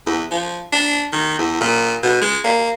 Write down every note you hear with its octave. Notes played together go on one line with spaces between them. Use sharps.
E2
F3
D4
D#3
E2
A#2
B2
G#3
A#3